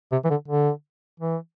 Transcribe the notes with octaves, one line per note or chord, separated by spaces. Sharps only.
C3
E3
D3
D3
E3